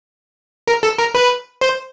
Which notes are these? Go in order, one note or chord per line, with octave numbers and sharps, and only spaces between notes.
A#4
A4
A#4
B4
C5